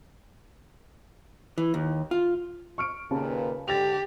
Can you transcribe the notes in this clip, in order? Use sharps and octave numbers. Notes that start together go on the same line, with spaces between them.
E3
D#2
F4
C#6 F6 D7
D#2 A#2 C#3 B4 A5
G#2 D3 G4 A6 A#6 F7